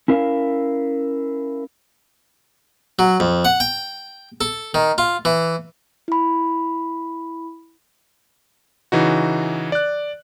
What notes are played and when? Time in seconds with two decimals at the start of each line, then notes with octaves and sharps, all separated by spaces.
0.08 C#4 E4 A#4 F5
2.99 F#3
3.20 F2
3.45 F#5
3.60 G5
4.41 A4
4.74 D#3
4.98 F4
5.25 E3
6.08 E4 B5
8.92 C#3 E3 D#4 F#4
9.72 D5 F#6